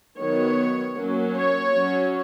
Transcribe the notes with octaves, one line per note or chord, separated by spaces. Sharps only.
D#3 F#3 B3 C#5
F#3 A#3 C#4
C#5
F#3 C#4